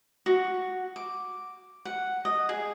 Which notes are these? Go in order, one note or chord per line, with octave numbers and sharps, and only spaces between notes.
F#4
D6
F#5
D#5
G#4